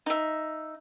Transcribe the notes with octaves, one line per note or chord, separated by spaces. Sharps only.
D#4 E5